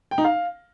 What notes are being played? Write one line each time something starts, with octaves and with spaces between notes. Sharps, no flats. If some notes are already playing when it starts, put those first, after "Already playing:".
G5
D#4
F5